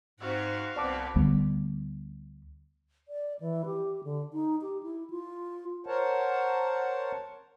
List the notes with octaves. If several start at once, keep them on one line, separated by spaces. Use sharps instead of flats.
G#2 C4 F#4 F5 F#5
C2 B3 C4 D5 A5 D6
D2 G3 B3
D5
E3
G4
D3
D#4
G4
E4
F4
A#4 C5 C#5 F#5 A5